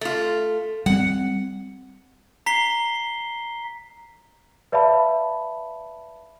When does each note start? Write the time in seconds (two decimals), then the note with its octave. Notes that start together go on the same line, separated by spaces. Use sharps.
0.01 A3 F4
0.86 G3 C4 F#5
2.46 A#5 B6 C7 G7
4.72 B4 D5 E5 F5 A5 B5